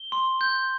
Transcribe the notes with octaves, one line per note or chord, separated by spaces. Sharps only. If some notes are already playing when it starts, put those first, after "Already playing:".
Already playing: G7
C6
G6